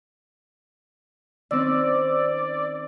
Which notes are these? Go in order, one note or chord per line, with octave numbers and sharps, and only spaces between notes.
D#3 C4 C#4 D5 E6